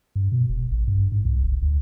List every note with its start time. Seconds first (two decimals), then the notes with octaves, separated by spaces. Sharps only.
0.16 G2
0.32 B2
0.49 E1
0.71 A1
0.88 G2
1.12 G#2
1.25 C2
1.43 E1
1.62 D2